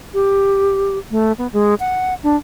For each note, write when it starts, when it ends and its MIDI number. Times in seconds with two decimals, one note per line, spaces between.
0.14 0.98 67
1.11 1.32 57
1.38 1.48 59
1.53 1.74 56
1.80 2.14 78
2.23 2.36 62